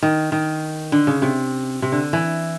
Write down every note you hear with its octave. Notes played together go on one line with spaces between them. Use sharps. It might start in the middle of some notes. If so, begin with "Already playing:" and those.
D#3
D#3
D3
C#3
C3
C3
D3
E3